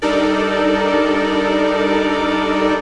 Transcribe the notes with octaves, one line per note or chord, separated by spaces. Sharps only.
G3 D4 D#4 A4 A#4 D5